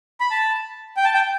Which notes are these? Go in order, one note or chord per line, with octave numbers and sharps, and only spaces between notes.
B5
A5
G5
A5
G5